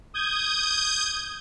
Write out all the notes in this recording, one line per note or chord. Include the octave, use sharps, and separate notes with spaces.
D#6 G6 G#6